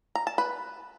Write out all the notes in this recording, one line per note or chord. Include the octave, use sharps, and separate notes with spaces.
A#5
A5
B4